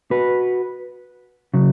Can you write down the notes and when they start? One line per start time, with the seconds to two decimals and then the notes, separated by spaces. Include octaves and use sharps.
0.11 F#4 B4
1.54 C#3 F#3